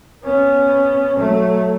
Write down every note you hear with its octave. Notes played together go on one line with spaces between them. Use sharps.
B3 C#4
F#3 A3